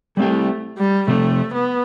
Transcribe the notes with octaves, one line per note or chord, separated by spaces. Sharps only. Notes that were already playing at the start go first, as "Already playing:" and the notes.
G3 A3 C4 G4
G3
C3 F3 A3 C4
B3